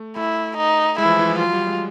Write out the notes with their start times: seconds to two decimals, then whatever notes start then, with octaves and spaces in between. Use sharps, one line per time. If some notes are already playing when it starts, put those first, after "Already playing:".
Already playing: A3
0.16 A3 E4
0.57 D#4
0.98 G#3 E4
1.05 E3
1.09 F3
1.19 E3
1.30 F3
1.39 F#3 F4
1.53 G3
1.67 G#3